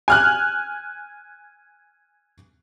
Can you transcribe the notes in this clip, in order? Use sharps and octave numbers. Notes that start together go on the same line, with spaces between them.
G#5 F6 F#6